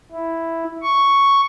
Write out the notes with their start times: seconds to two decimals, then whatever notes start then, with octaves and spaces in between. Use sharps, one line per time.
0.12 E4
0.82 C#6